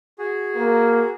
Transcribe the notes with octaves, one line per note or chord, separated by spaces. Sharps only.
F#4 G#4
A#3